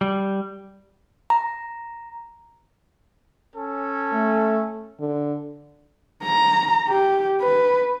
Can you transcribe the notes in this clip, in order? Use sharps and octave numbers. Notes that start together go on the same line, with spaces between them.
G3
A#5
C#4 A4
A3
D3
A#5
G4
B4